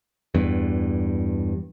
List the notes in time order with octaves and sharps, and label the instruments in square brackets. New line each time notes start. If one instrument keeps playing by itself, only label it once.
[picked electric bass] E2 G2